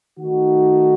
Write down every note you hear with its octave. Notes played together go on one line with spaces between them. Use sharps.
D#3 A3 D#4 F#4